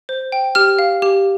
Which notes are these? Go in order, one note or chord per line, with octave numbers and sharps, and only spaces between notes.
C5
G5
G4 F6
F5
G4